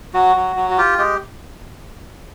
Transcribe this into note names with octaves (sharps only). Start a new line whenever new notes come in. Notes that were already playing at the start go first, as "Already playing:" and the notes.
F#3 F#4
F#3
F#3
F#4
F4 G4
G#3 G4